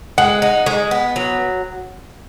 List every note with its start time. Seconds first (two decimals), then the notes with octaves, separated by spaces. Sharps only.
0.18 G#3 F#5
0.42 D#4
0.66 G#3
0.91 B3
1.16 F#3